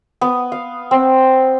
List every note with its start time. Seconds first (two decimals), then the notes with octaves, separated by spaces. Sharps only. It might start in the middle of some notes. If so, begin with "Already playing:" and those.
0.21 B3
0.52 F5
0.91 C4